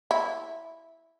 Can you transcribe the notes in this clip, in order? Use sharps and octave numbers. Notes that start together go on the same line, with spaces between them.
E4